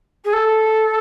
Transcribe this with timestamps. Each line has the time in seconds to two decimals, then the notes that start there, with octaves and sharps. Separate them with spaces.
0.24 G#4
0.33 A4